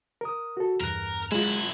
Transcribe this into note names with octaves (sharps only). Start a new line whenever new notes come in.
A#4 D#6
F#4 A4
E2 G2 A#4 F#6
F#2 G#3 E4 F4